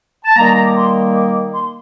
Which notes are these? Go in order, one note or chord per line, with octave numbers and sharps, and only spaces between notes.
A5
D#3 G3 A#3 A#5
D6
C6
D6
C6